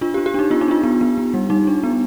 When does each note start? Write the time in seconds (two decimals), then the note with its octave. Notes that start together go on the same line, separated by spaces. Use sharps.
0.01 D4 F4
0.14 G4
0.18 D4
0.26 G4
0.34 D4 D#4
0.50 B3 F4
0.61 D#4
0.68 D4 F4
0.84 B3
1.01 B3
1.18 B3
1.34 G3
1.50 G3 D#4
1.67 D4
1.83 B3